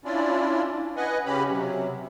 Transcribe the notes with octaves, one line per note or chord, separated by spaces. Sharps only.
C#4 D4 E4 F4 D5
B4 D#5 F#5 G#5
C#3 C#4 G4 B5
C3 F#3